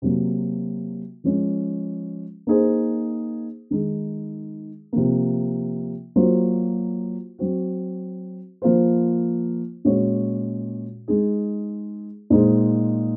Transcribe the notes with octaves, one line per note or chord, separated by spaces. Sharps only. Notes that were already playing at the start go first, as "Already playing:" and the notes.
C3 F#3 A#3
F3 G#3 C#4
A#3 D#4 G#4 C5
D#3 G#3 D#4 G#4
C3 F3 A#3
F#3 A#3 F4 C5
F#3 C4 F#4
F3 A#3 F4 C5
A#2 G#3 C#4 F#4 C#5
G#3 D#4 G#4
A#2 G#3 D#4 G#4 C5